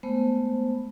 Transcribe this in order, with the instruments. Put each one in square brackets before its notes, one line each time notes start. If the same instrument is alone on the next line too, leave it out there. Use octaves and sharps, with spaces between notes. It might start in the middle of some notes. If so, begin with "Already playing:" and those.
[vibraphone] G#3 A3 B3 C5